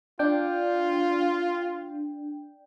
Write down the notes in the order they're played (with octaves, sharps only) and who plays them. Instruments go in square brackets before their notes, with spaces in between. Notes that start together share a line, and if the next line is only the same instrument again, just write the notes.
[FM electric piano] D4 G5 [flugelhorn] F4